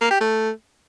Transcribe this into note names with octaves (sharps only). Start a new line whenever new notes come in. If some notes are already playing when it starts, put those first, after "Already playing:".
A#3
G4
A3